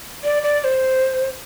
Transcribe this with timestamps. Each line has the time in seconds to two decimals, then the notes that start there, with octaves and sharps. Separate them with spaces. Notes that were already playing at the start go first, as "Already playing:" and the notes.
0.24 D5
0.43 D5
0.61 D5
0.64 C5